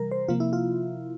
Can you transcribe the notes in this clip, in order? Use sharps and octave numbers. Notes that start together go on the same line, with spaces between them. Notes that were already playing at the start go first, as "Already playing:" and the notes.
Already playing: C3 E3 G3 A#4
C5
C3 F3 A#3 F4
E4
F4